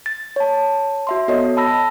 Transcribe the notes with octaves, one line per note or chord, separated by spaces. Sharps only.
A6
C#5 A5
F#4 E5 C6
B3 F#4 A4 C#5 D#5
A5 B5 E6 A#6